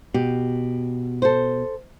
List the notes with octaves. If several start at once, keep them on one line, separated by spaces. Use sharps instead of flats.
B2 G4
A4 C5